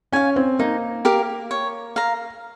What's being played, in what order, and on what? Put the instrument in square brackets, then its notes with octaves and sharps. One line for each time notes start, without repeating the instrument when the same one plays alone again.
[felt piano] C#4 [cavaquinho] F5 G#5
[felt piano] C4
[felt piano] A#3 [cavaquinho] D#4
[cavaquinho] G4 A#4 F5
C#5
F5 A#5